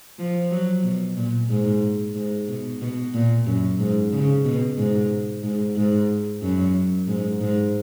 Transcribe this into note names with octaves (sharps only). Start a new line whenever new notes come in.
F3
F#3
B2
A#2
G#2
G#2
B2
B2
A#2
F#2
G#2
C#3
B2
G#2
G#2
G#2
F#2
G#2
G#2